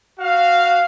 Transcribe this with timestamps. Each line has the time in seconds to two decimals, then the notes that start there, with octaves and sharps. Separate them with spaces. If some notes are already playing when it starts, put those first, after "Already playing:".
0.20 F#4 F5